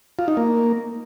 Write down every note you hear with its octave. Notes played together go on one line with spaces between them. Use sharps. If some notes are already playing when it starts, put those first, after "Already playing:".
F4
D#4
A#3